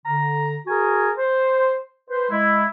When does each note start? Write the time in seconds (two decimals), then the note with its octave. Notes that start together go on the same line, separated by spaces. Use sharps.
0.05 D3 A#5
0.67 F#4 G#4 A#4 G#5
1.18 C5
2.09 B4 C5
2.30 G#3 E4